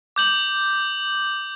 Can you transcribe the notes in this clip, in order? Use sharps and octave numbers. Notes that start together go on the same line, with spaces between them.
D6 G6 F#7